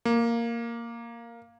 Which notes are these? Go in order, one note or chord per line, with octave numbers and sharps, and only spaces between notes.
A#3